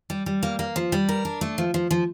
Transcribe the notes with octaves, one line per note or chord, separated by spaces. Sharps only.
G3
G3
A#3
A#3
F3
G3
A#4
D4
A3
F3
F3
F3